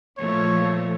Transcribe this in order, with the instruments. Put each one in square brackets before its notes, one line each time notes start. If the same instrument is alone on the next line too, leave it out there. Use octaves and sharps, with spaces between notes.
[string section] A#2 E3 A3 [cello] F3 [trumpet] C#5